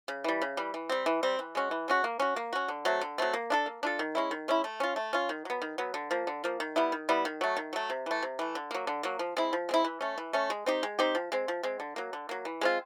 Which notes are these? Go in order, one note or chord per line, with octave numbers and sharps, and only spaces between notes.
C#3
E3 G3
C#3
E3 G3
E3
G3 C4
E3
G3 C4
E3
G#3 C#4 F#4
E3
G#3 C#4 F#4
A#3
C#4 F#4
A#3
C#4 F#4
D3
F#3 A3 C4
D3
F#3 A3 C4
A#3
D4 F4 A4
A#3
D4 F4 A4
D#3
G#3 C#4 E4
D#3
G#3 C#4 E4
A3
C#4 F4
A3
C#4 F4
D#3
F#3 B3
D#3
F#3 B3
D3
F3 A#3
D3
F3 A#3
D#3
G3 B3 E4
D#3
G3 B3 E4
D#3
F#3 A3
D#3
F#3 A3
C3
E3 A3
C3
E3 A3
D3
F#3 A#3
D3
F#3 A#3
F3
G#3 C4 E4
F3
G#3 C4 E4
E3
A3 C#4
E3
A3 C#4
G#3
C4 D#4 G4
G#3
C4 D#4 G4
F3
G#3 C4
F3
G#3 C4
D3
F#3 A#3
D3
F#3 A#3
E3
G#3 C4 F4